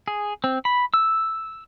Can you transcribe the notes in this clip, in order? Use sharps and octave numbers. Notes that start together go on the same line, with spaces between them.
G#4
C4
B5
E6